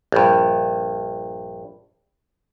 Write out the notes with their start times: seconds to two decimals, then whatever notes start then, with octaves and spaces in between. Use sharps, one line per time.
0.12 A#1 G2